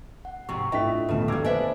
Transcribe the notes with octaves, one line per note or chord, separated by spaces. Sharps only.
F#5
G#2 C3 C#6
A2 D4 F4 D#5 E5 G5 B6
D#1 D2 C#3 B3 A4 A5
G3 A#3 D6 E6 G#6
D4 B4 C5 D#5 E5 G#5